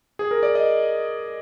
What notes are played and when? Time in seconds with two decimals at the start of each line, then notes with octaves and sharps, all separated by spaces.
0.19 G#4
0.31 A#4
0.43 D5
0.55 D#5